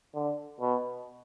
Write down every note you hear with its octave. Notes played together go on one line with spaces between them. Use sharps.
D3
B2